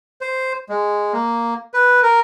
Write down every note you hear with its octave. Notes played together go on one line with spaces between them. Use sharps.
C5
G#3
A#3
B4
A#4